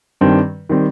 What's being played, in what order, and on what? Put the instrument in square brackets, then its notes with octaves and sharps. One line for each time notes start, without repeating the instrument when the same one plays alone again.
[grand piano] G2 D#3 G3 C4
D#3 G3 C4